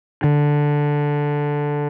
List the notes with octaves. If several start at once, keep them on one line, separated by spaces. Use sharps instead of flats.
D3